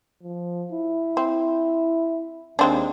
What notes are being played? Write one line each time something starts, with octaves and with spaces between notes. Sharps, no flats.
F3
E4
C4
D#2 G#3 C4 D4